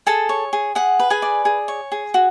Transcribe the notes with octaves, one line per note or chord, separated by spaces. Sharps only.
G#4 A4 A5
C#5
G#4
G#4 F#5
B4
G#4 G#5
D5
G#4
C#5
G#4
F#4